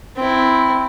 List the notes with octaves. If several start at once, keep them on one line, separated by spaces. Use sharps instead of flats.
C4 E4